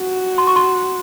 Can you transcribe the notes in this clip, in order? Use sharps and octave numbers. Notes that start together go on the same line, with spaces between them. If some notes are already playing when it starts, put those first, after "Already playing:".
Already playing: F#4
C6
C#6
C6